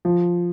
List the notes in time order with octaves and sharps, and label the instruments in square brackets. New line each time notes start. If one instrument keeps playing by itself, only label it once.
[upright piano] F3